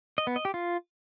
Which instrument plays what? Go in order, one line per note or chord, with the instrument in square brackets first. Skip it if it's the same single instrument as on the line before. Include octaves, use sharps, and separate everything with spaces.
[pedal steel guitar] D#5
B3
D#5
G4
F4